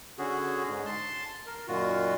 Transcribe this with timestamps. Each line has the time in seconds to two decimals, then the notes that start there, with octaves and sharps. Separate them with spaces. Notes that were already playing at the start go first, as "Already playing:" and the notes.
0.18 D3 C#4 F#4 G#4
0.68 G#2
0.86 A5 C6
1.47 A#4
1.68 F#2 A#2 D#3 F4 F#4